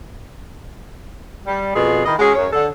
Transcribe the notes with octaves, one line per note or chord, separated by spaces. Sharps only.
G3
F2 B2 F4 G#4
D#3 E4 D#5
G#3 C#4 F#4 G#4
F#2 C#5
D3 A4